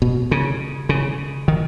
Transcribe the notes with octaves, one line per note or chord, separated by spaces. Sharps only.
B2
C#3
C#3
D#3